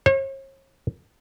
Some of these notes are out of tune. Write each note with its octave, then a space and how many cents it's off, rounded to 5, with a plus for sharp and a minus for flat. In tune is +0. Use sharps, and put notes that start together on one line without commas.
C#5 -45